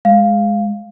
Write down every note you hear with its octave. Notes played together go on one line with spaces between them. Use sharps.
G#3 F5